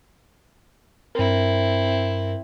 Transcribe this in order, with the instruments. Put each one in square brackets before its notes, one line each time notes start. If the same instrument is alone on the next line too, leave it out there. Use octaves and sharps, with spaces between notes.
[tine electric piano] G2 A#4 [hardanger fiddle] C4 E4